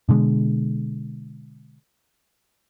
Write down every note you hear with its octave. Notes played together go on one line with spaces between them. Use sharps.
B2 D3 G#3